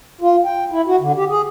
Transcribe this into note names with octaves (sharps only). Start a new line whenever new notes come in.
F4
G5
E4
F#4
D3
G4
G#4